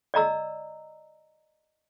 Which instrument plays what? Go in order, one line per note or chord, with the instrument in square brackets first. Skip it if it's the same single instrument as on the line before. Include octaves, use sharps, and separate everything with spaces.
[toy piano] D5 D#5 A#5 E6